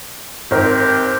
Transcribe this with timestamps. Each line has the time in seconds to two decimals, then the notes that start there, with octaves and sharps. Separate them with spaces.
0.51 G#1 C4 G4 A#4